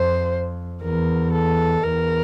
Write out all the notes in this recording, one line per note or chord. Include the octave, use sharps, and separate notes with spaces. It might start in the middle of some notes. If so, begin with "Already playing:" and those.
Already playing: F2 C5
E2 A#4
A4
E2 A#4